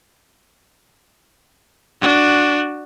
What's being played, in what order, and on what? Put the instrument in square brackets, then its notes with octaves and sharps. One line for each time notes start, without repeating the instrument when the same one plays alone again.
[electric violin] D4 F#4